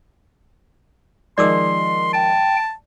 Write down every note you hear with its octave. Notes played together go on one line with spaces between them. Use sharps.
D#3 F3 G#3 D5 C6 D6 E6
G5 A5